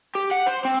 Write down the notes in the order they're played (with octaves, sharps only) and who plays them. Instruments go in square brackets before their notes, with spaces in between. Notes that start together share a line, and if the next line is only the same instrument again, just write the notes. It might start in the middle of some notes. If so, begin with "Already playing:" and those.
[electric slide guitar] G4
F#5
C5
C4